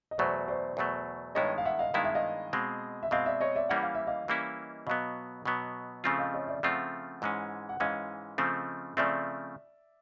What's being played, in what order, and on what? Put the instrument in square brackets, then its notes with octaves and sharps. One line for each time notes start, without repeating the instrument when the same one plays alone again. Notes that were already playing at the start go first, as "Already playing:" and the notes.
[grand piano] D#5
[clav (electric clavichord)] E2 B2 F#3 A3 [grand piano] C5 D5
[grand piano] C5 D5
[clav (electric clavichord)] E2 B2 F#3 A3
[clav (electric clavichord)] G2 D#3 G#3 B3 E4 [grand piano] C#5 D#5
[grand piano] F5
E5 F#5
D#5 F5
[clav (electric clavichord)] G2 D#3 G#3 B3 E4 [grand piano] F5
[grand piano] E5
D#5 F5
[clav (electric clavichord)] B2 G#3 C4
[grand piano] E5
[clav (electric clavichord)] B2 G#3 C4 [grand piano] D#5 F5
[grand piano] D5 E5
C#5 D#5
D5 E5
[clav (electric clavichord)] E3 G3 A#3 C#4 E4 [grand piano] F#5
[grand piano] F5
E5
D#5 F5
[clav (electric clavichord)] E3 G3 A#3 C#4 E4
[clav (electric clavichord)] B2 F#3 B3 [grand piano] D#5 F5
[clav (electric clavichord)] B2 F#3 B3
C#3 F3 A3 C4 F4
[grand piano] D#5 F5
C#5 D#5
D5 E5
[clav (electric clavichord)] C#3 F3 A3 C4 F4 [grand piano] E5 F#5
[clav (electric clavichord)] G#2 E3 G#3 C#4
[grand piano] F#5
[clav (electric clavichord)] G#2 E3 G#3 C#4 [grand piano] D#5 F5
[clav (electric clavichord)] C#3 F3 A3 C4
[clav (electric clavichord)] C#3 F3 A3 C4 [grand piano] D5 E5